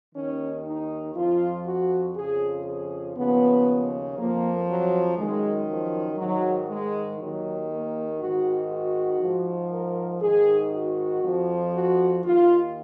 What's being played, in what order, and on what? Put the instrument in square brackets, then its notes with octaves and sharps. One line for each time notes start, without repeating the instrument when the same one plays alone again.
[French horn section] D#2 D#3 C#4
D#4
F2 F3 F4
F#4
F2 C#3 F3 G#4
G#4
D#2 C#3 F3 B3
F2 F3 A#3
F#3
F#2 D#3 G#3
F3
G#2 D#3 F#3
G#3
D#2 D#3 F#3
A#3
G#2 D#3 F#4
F#4
G#2 F3
A#4
G#2 D#3 G#4
F#4
F2 F3
F#4
D#2 D#3 F4